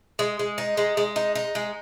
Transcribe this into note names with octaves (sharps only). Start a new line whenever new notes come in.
G#3
G#3
D#4
G#3
G#3
D#4
D#4
G#3